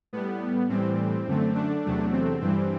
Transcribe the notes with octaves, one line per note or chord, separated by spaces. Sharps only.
A2 G3 B3
A2 E3 G3 C4
F#2 D3 A3
D4
E2 C3 F#3 A3
C4
G2 E3 G3 C4